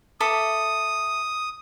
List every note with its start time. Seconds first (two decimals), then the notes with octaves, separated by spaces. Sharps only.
0.20 A4 E5 D6 D#6